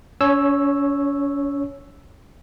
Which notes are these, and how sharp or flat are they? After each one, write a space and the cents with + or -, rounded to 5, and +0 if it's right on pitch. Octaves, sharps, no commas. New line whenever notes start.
C#4 +35 C#5 -5 E6 +0